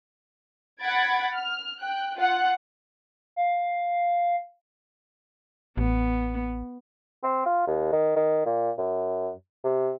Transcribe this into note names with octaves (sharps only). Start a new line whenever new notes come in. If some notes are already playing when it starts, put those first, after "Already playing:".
F#5 B5 G#6 A6 D7
F6
G5 F#6
F4 F#5 F#6
F5
A1 B3
C4
F4
D#2
D#3
D#3
A#2
F#2
C3